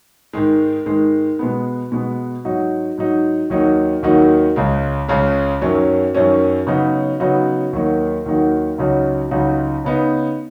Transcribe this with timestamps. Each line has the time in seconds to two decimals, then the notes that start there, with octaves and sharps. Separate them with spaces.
0.33 G#2 D#3 G#3
0.86 G#2 D#3 G#3
1.39 B2 G#3 B3
1.92 B2 G#3 B3
2.45 G#2 F#3 D#4 F#4
2.98 G#2 F#3 D#4 F#4
3.50 D#2 D#3 F#3 D#4 F#4
4.03 D#2 D#3 F#3 D#4 F#4
4.56 C#2 C#3 G#3
5.09 C#2 C#3 G#3
5.61 F#2 D#3 F#3 C#4
6.15 F#2 D#3 F#3 C#4
6.67 C#3 F#3 B3 D#4 F#4
7.20 C#3 F#3 B3 D#4 F#4
7.73 D#2 D#3 F#3 D#4 F#4
8.26 D#2 D#3 F#3 D#4 F#4
8.78 C#2 C#3 F#3 D#4 F#4
9.31 C#2 C#3 F#3 D#4 F#4
9.85 C#3 B3 D#4